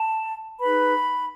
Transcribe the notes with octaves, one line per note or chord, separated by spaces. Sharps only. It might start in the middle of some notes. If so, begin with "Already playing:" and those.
Already playing: A5
D#4 G#4 B4 B5